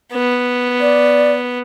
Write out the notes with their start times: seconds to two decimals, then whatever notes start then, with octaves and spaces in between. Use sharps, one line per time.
0.12 B3
0.81 D5